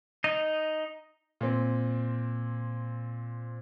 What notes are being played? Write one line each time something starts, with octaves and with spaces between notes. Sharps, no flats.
D#4 D#5
A#2 C4